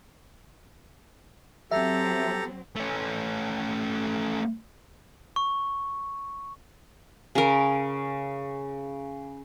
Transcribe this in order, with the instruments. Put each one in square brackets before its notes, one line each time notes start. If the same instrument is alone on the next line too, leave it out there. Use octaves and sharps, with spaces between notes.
[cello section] F#3 C4 [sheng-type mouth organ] G4 A4 A#5 [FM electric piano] E5
[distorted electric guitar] A3 C#4
[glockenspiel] C#6
[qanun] C#3 A#4